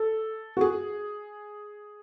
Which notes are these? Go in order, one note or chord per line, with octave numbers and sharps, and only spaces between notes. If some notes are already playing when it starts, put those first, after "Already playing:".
Already playing: A4
F#4
G#4